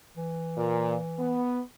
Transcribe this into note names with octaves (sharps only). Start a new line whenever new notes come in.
E3
A#2
B3